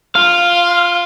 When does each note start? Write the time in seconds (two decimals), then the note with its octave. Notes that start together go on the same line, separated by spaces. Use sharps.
0.15 F4 F5